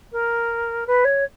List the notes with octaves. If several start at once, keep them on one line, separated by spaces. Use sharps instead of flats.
A#4
B4
C#5